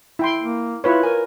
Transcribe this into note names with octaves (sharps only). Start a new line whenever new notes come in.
E4 G5 C6
A#3
E4 F4 B4 C#5
A#4 G#5